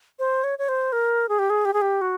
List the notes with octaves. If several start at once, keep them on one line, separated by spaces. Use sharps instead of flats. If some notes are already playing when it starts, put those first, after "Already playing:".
C5
C#5
C#5
C5
A#4
G#4
G4
G#4
G4
G#4
G4
F#4